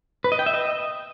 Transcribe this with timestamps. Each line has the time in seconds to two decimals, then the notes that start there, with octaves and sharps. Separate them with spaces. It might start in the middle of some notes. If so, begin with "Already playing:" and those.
0.24 B4
0.32 D#5
0.39 G5
0.46 E5
0.54 D#5